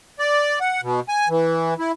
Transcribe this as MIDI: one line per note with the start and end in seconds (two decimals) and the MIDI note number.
0.19 0.59 74
0.60 0.81 78
0.82 1.00 47
1.09 1.28 80
1.29 1.74 52
1.79 1.92 64